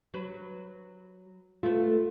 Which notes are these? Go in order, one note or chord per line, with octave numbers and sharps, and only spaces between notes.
F#3 B4
A3 B3 F4